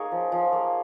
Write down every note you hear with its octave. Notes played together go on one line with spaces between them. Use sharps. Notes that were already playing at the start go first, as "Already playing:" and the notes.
Already playing: A#3 D#4 G#4 C#5 D#5
F3
F3
A#3